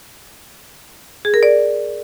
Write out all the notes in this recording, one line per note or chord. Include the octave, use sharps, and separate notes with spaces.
G#4
A#4
D5